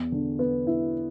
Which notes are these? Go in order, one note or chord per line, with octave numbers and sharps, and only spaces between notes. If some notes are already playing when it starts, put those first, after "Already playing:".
Already playing: E2
D3
B3
E4